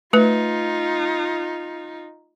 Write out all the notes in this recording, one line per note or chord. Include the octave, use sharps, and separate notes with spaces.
A3 D#4 F4 B4